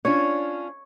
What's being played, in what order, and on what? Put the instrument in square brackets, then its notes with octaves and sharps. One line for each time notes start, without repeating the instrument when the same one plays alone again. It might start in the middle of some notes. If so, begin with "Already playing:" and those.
[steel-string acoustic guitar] C#4 D4 F4 [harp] C#5